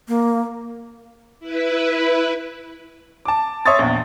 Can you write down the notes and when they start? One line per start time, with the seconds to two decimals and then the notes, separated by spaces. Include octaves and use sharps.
0.08 A#3
1.40 E4 B4
3.25 A5 D6
3.66 C#5 E5 C6 C#6 D#6 A6
3.79 A#1 E2